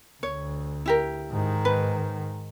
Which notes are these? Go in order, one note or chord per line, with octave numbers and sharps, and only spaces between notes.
D2 C#5
E4 G4 A#4
G#2 D#3
B4